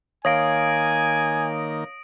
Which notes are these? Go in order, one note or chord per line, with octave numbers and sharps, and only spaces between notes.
D#3 A#3 C#5 F5 G#5 D#6 A#6 D7